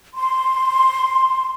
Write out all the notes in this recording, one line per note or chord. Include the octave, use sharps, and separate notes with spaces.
C6